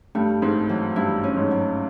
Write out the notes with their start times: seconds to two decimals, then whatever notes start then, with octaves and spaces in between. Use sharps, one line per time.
0.15 G2 G3 A3
0.42 G#2 G#3 C4
0.69 E3 F#3
0.96 G2 G3 E4
1.23 C#4
1.37 G#2 G#3
1.51 F#3